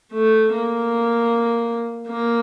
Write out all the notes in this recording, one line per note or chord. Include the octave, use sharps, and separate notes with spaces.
A3
A#3
A#3